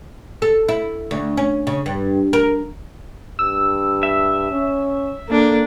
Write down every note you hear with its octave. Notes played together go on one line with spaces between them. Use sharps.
A4
E4
D2
C#4
C#3
G2
A#4
G2 E6
E5
C#4
A#3 D4 A4